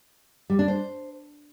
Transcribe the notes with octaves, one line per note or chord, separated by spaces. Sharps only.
G3
D4
C5